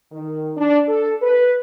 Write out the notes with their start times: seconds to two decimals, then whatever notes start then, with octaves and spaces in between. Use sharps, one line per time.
0.11 D#3
0.57 D4
0.88 A4
1.22 B4